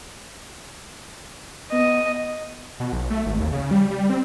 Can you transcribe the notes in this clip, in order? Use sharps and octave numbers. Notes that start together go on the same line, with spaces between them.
B3 D#5
B2
B1
A3
G#1
D#2
C#3
G3
G3
C4